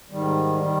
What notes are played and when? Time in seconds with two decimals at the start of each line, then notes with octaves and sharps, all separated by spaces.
0.10 G#2 D#3 G3
0.60 D#3 G3